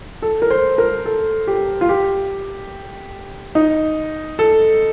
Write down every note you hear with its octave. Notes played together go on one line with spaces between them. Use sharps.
A4
A#4
C5
A#4
A4
G4
F4
G4
D#4
A4